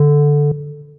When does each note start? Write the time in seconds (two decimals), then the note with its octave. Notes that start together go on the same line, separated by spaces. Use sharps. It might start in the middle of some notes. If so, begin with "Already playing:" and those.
Already playing: D3